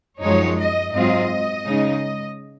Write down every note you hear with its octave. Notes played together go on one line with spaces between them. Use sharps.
F#2 F3 G#3 D#4 C#5
D#5
G#2 F#3 C4 F4 D#5
C#3 G#3 D#4